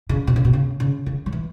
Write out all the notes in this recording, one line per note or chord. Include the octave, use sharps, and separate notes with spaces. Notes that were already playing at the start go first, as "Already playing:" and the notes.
C#3
B2
C#3
B2
C#3
C#3
C#3
F#3
E3